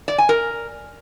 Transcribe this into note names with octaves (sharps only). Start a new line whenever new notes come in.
D5
G#5
A#4